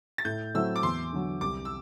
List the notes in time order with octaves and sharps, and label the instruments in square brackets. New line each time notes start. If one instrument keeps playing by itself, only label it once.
[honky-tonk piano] A6
[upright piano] A2 [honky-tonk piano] G6
[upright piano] F#3 A3 C4 E4 [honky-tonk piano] E6
[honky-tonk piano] D6
[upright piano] E2 [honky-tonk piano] C6
[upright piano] D3 F#3
[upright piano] C2 [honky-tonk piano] D6
[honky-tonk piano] E6